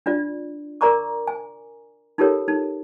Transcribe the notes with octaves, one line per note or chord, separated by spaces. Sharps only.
D4 F4 D5
A#4 D5 A#5 C#6 D6
G#5
D#4 F4 G4 A4 A#4 C#5
D#4